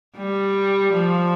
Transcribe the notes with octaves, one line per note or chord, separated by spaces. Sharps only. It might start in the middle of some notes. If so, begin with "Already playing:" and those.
G3
F3